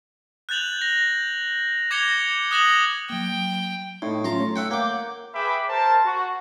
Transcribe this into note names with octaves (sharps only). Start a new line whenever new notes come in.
F#6 G6 A6 F7 F#7
A#6
D6 G#6 A#6 C#7 F7 G7
D#6 F#6 A#6 E7 F#7 G7
F#3 A#3 G5
A2 D#4
F#3 C#4 F4 A5 A#5 C6
A3 C#5
E5 F#5 G5
A#3 F#5 D6 G6
G#4 B4 E5 G5 B5 D6
A#4 C5 A5
F#4